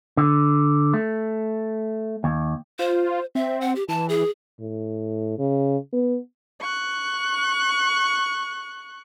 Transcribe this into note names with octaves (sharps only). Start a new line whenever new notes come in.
D3
A3
D#2
F4 C5
C4 E5
F#5
G4
E3 A5
G#4
A2
C#3
B3
C#6 F#6